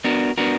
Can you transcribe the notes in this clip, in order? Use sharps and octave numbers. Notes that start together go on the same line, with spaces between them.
B3 D4 F#4 A#4
B3 D4 F#4 A#4